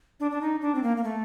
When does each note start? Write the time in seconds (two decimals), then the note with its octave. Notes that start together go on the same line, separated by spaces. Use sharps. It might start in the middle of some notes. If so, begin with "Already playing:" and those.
0.20 D4
0.31 D4
0.41 D#4
0.61 D4
0.75 C4
0.83 A#3
0.97 A#3
1.04 A3